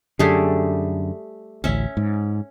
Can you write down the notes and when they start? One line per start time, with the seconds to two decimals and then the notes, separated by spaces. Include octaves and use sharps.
0.19 F#2 D3 G3 A3 G#4
1.64 A1 D2 C#4 E5
1.97 G#2